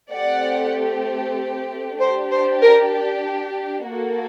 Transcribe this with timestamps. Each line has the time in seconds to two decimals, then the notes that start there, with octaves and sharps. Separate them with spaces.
0.11 A3 C4 G4 D5 F#5
1.99 D4 G4 C5
2.31 C5
2.62 A#4
3.88 A#3 F#4 A4